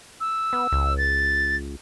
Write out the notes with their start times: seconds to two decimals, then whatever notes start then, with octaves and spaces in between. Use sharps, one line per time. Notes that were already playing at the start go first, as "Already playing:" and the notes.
0.21 E6
0.53 B3
0.72 C#2
0.98 A6